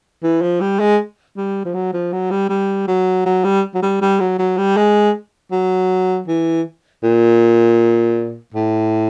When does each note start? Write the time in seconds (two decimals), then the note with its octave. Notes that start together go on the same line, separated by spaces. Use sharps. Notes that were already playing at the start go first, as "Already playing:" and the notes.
0.23 E3
0.41 F3
0.61 G3
0.79 G#3
1.37 G3
1.65 F3
1.74 F#3
1.93 F3
2.13 F#3
2.31 G3
2.49 G3
2.88 F#3
3.26 F#3
3.44 G3
3.74 F#3
3.82 G3
4.01 G3
4.20 F#3
4.39 F#3
4.58 G3
4.76 G#3
5.52 F#3
6.28 E3
7.03 A#2
8.54 A2